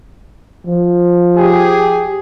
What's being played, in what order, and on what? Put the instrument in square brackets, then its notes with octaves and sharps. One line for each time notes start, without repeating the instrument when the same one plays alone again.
[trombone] F3
[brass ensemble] G4 G#4